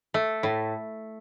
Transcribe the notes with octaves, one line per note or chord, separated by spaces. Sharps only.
A3
A2